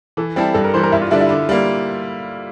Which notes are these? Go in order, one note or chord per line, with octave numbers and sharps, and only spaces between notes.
E3 A4
G3 C4 E4 G4 A4
G2 A4
A#4
E3 G3 C5
A#4
G2 E4
F4
D3 G3 D4 E4
E4
D3
G3 A#3